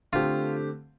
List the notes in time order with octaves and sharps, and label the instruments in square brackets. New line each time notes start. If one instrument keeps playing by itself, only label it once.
[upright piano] D3 A3 C4 G4 [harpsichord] F4